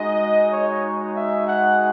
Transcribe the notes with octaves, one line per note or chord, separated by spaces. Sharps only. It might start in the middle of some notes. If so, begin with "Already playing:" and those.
Already playing: G#3 D#4 F#4 D#5
C#5
E5
F#5